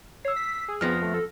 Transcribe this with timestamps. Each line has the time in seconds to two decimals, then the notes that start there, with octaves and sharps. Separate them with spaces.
0.25 C#5 E6 C7
0.36 B6
0.68 G#4
0.81 F2 F3 B3 F6 A#6
1.02 A3
1.14 A4